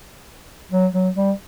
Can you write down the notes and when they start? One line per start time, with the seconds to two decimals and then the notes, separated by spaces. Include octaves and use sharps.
0.71 F#3
0.94 F#3
1.16 G3